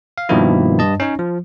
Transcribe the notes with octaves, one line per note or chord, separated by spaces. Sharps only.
F5
G2 B2 D#3 F3 A#3 E4
G2 D#5 A5
C#4 D#4 C#5
F3